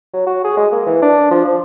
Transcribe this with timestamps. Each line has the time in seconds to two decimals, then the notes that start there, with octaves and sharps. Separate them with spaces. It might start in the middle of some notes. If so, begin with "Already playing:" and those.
0.13 F#3
0.26 F#4
0.44 G#4
0.57 G#3
0.72 A#3
0.86 E3
1.02 D4
1.31 F3
1.45 F3